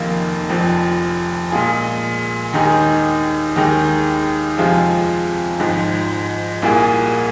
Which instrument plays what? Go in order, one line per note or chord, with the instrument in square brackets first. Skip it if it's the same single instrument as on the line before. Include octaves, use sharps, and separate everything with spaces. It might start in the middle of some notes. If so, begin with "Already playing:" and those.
Already playing: [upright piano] F1 F2 D#3 A#3 F4
F1 F2 F3
A#2 G#3 F4 G#4
D#2 D#3 G#3 D#4 G#4
D#2 D#3 G#3 D#4
F2 C3 F3 G#3 F4
G#1 G#2 F3
C2 A#2 A#3 G#4